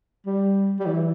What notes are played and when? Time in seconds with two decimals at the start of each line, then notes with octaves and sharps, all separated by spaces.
0.26 G3
0.79 G3
0.86 E3